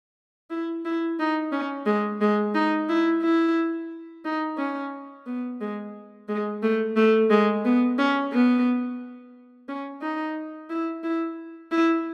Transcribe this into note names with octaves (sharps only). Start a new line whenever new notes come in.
E4
E4
D#4
C#4
G#3
G#3
D#4
E4
E4
D#4
C#4
B3
G#3
G#3
A3
A3
G#3
B3
C#4
B3
C#4
D#4
E4
E4
E4